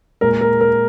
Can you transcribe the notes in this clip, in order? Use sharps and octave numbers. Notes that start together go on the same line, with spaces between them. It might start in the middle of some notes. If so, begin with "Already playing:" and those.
A#2 G#3 A#4
A#4
A#4